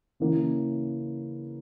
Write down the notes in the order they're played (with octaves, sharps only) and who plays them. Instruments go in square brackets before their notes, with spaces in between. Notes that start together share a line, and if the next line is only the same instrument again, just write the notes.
[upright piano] C#3 E3 A#3